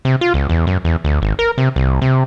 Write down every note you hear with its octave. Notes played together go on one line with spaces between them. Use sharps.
C3
F4
C#2
E2
F#2
E2
D2
G#1
A#4
C3
C2
C3